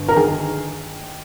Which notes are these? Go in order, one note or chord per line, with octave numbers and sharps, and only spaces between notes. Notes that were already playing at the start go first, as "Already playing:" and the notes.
Already playing: G1
A#4
D#3 G#4